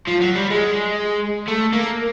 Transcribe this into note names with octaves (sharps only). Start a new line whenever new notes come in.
F3
F#3
G3
G#3
A3
A#3